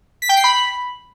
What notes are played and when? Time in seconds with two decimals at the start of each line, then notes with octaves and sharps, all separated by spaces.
0.22 B6
0.29 G5
0.37 C7
0.44 B5